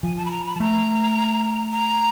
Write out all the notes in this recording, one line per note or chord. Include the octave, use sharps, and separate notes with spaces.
F3 G#5
A5
B5
A#5
B5
A5
A3 A#5
A#5